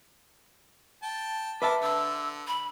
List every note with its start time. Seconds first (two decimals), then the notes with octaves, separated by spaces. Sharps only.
1.03 G5 A5
1.62 A#4 B4 E5 A5 D6
1.83 D3 E6
2.47 B5